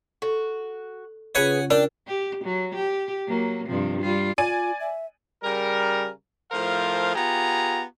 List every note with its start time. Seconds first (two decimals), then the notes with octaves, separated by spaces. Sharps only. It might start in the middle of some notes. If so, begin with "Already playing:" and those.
0.22 F#4 A4
1.35 C#3 C#4 F4 G#4 B4 C#5 F#5 G#5
1.70 D4 A#4 D5 G5
2.08 G4
2.44 F#3
2.75 G4
3.28 F#3 A#3
3.67 G2 C3 F3
4.01 G3 F4
4.38 F4 D5 G#5 D#7
4.80 E5
5.43 C#3 G3 A#4
6.52 A2 F3 A#4 C5 F5
7.15 B3 F4 G4 G#4 A#5